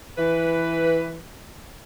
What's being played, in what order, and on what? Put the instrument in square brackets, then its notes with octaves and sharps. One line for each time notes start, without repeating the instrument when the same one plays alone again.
[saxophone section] E3 B4